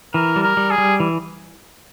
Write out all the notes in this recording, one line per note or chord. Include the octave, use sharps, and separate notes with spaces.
E3 A#4
G3
A#4
G3
G#4
G3
E3